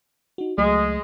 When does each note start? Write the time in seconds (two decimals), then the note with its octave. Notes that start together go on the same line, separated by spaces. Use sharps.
0.38 D#4 F#4
0.58 C#2 F#3 G#3 A3